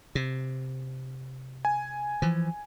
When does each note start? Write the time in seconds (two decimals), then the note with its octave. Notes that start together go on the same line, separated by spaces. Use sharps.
0.15 C3
1.65 G#5
2.22 E3 F3